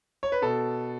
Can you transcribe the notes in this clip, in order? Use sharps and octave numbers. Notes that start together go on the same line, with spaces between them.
C#5
B4
B2 A4